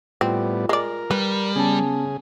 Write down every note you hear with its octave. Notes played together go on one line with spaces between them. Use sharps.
A2 G3 B3 C4 F4
G#3 A#4 D5
G3 B4
C#3 B3 C#4 G#4 A5